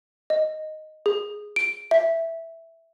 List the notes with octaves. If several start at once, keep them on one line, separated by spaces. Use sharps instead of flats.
D#5
G#4
D7
E5